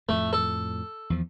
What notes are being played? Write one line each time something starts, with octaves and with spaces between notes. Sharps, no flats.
F2 A2 A3
A4
E2 F3